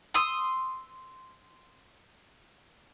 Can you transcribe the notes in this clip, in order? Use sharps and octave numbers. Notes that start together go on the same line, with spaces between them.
C6 D#6 E6